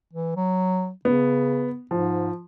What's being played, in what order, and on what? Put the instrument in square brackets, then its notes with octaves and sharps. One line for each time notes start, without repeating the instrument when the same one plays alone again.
[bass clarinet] E3
F#3
[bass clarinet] C#3 [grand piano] B3
[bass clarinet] G#2 [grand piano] F3